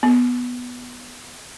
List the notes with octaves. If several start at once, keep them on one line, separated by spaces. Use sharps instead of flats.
B3